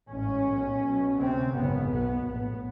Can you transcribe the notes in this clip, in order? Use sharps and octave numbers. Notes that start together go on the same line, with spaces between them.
A1 G#2 C#4
B1 A#2
B1 B2
D2 C3 C4
G#1 F#2 C#3 B3
B1 B2 B3
A#1 A2 B3